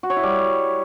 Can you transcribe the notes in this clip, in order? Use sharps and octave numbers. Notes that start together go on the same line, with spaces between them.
F#4
C#5
E4
G3